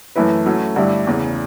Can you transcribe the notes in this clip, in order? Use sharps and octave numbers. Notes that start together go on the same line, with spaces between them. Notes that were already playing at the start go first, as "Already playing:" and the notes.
F#2 E3 A3 E4 B4
F#3 A3 C#4 E4
G2 D3 A3 E4 G4
E2 C#3 E3